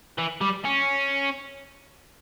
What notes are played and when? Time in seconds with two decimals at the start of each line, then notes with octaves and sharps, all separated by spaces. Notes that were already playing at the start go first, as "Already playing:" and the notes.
0.18 E3
0.41 G3
0.65 C#4